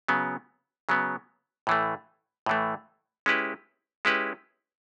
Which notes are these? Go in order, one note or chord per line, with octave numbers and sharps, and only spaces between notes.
C#3 F#3 B3
C#3 F#3 B3
A2 E3 A3
A2 E3 A3
G#3 C#4 E4 G4 B4
G#3 C#4 E4 G4 B4